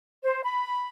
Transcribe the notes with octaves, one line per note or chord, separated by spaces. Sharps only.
C5
B5